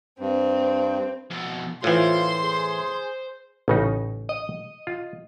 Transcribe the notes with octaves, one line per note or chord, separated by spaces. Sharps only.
G2 C4
F2 B2
A2 E3 F4 C5 C6
G#4
A1 A2 C#3 D#4
D#5
F4